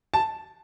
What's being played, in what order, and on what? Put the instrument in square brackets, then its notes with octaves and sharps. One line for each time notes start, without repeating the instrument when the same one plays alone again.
[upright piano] A5